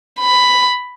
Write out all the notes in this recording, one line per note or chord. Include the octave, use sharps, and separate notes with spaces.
B5